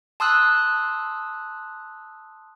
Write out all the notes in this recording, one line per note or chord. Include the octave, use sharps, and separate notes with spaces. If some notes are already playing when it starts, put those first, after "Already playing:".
A5 C6 D#6 E6 F#6